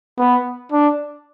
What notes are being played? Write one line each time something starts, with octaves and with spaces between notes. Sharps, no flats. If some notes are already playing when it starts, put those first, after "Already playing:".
B3
D4